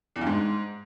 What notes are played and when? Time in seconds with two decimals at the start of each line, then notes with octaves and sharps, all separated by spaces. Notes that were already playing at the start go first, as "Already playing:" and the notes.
0.16 E2
0.21 G2
0.27 G#2